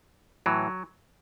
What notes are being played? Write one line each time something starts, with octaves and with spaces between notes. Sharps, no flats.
A2 E3 F#3